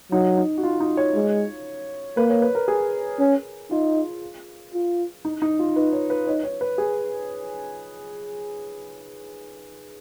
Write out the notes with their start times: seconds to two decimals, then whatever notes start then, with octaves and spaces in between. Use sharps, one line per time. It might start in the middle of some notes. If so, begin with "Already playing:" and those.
0.12 F#3 D#4
0.38 D#4
0.58 F#4
0.63 F4
0.80 D#4
0.97 C#5
1.14 G#3
2.17 A#3 B4
2.30 C#5
2.42 B4
2.55 A#4
2.68 G#4
3.19 C#4
3.71 D#4 F4
4.74 F4
5.25 D#4
5.42 D#4
5.59 F4
5.75 D#4 B4
5.93 C#5
6.10 B4
6.27 D#4 C#5
6.43 C#5
6.61 B4
6.78 G#4